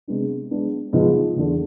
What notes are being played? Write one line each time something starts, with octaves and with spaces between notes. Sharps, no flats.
C3 G#3 B3 D4
G#3 B3 D4
G#2 F3 B3
E2 D3 A3